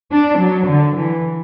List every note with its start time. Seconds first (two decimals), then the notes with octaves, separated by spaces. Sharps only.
0.12 D4
0.39 F#3
0.67 D3
0.96 E3